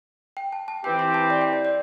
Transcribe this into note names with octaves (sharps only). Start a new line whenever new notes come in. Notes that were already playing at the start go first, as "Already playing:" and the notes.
G5
A5
A5
E3 C4 G4 G5
C6
A5
D5
G5
D5
D5